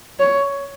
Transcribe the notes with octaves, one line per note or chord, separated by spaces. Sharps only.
C#5